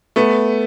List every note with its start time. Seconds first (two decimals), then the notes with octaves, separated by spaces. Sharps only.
0.16 A3 B3